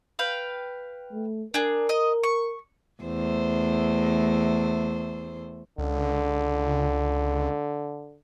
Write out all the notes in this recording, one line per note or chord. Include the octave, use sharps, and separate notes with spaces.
B4 F5 G5
A3
D4 G#4 A#4
D#5
C#6
E2 A3 C5
C#2 D3